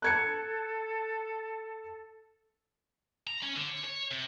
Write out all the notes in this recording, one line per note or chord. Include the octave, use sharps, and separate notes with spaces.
A4 F#6 G#6 C#7
A#5
C#4
D3
C#5
C#5
C3